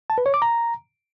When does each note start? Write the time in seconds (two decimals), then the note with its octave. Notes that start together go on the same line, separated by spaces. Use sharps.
0.10 A5
0.18 B4
0.26 C#5
0.34 D6
0.42 A#5